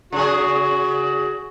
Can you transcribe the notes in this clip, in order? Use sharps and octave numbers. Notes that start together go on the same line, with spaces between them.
C#3 F#4 G#4